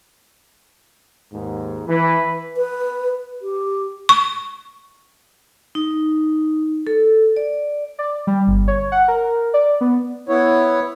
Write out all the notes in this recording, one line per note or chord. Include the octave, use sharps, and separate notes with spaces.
D#2 G#2
E3 B4
B4
G4
C#6
D#4
A4
D5
D5
G3
G1
C#5
F#5
A#4
D5
B3
B3 E4 C#5